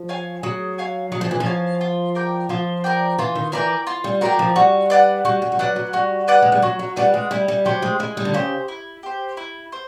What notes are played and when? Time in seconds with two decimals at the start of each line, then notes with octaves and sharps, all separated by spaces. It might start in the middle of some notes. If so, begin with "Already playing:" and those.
Already playing: F3
0.09 C#5 F5 G#5
0.43 F#3 G#4
0.78 C#5 F5 G#5
1.12 F#3 G#4
1.21 F3
1.31 E3
1.40 F3
1.46 C#5 F5 G#5
1.81 F4
2.15 A#4 D5 G5
2.49 F3 F4
2.84 A#4 D5 G5
3.18 E3 F4
3.35 D#3
3.52 E3 A#4 D5 G5
3.87 F4
4.04 G3
4.21 F#3 A#4 D5 G5
4.39 F3
4.56 G3 F#4
4.90 B4 D5 F#5
5.25 G3 F#4
5.42 G3
5.52 G3
5.59 F#3 B4 D5 F#5
5.76 F#3
5.93 G3 F#4
6.28 B4 D5 F#5
6.42 G#3
6.52 G3
6.62 F#3 F#4
6.79 F#3
6.96 G3 B4 D5 F#5
7.14 G#3
7.31 G3 E4
7.48 G3
7.65 F#3 G4 C5
7.82 G#3
7.99 G#3 E4
8.17 G3
8.25 D3
8.34 C#3 G4 C5
8.68 E4
9.03 G4 C5
9.37 E4
9.72 C5